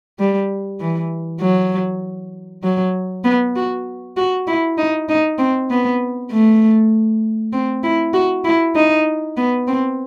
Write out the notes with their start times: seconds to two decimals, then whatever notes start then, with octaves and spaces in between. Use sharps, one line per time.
0.19 G3
0.80 E3
1.41 F#3
2.63 F#3
3.24 B3
3.56 F#4
4.17 F#4
4.47 E4
4.77 D#4
5.09 D#4
5.38 C4
5.70 B3
6.31 A3
7.52 C4
7.83 E4
8.13 F#4
8.44 E4
8.75 D#4
9.37 B3
9.67 C4